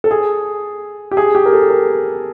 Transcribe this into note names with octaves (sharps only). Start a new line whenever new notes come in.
A4
G#4
G4
G#4
G4
A#4
A4
A#4